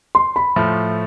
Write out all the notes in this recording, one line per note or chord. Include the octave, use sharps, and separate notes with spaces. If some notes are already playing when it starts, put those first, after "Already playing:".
C6
B5
A2 F3 A3